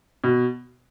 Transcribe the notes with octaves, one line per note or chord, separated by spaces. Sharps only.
B2